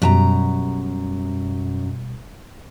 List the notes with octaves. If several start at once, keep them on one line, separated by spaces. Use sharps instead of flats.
F#2 B2 G3 A5 A#5